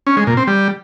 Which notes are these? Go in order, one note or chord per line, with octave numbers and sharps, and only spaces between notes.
C#4
G#3
A#2
C4
G3